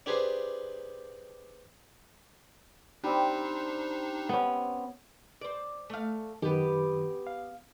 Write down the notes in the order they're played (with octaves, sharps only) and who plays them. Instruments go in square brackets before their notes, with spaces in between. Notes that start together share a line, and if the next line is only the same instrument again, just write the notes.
[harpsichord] D4 G4 G#4 B4 C5
[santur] G3 C4 [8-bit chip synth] D4 D#4
[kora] B3 C#4
[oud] C5 D5
A3 F5
[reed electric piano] F#2 D#3 [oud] B3 G4
[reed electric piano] F5